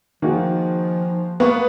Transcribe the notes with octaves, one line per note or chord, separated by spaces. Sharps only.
D#3 F3 A#3 F#4 G#4
A#3 B3 F5 C#6